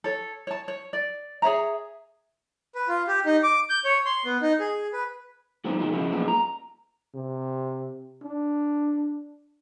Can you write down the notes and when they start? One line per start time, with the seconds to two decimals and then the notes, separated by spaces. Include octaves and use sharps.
0.04 A4 C#5
0.47 C#5 A5
0.68 C#5
0.93 D5
1.42 G#4 C#5 E5 A#5
2.75 B4
2.88 F4
3.08 G4
3.26 D#4
3.43 D6
3.70 G6
3.85 C#5
4.05 C6
4.25 B3
4.42 D#4
4.60 G#4
4.93 B4
5.64 D#2 G#2 F#3 B3 C4 D4
5.80 G2 B2 D#3 F3 G#3
5.92 F2 C#3 F3 G#3 E4
6.12 F#2 A#2 G#3 B3 D4
6.28 A#5
7.14 C3
8.23 D4